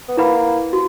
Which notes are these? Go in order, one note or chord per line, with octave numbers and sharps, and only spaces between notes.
B3
A#3 E4 B4 F#5 B5
F#4